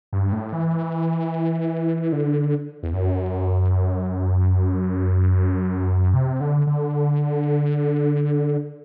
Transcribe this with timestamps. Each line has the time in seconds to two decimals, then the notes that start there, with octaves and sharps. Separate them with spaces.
0.13 G2
0.32 A2
0.52 E3
2.12 D3
2.83 E2
2.93 F#2
6.14 C3
6.41 D3
6.67 D3